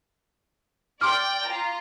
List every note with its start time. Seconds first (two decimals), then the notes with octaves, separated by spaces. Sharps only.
1.01 D5 G5 C6 D6 F6
1.47 F4 A#5